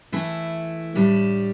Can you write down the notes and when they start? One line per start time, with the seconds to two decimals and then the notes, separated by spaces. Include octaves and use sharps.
0.12 E3 A3 E4
0.95 A2 G3 D4